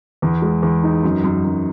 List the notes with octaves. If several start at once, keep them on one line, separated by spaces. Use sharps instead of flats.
E2
G#3
E2
D#4
F#2
F#2
F#2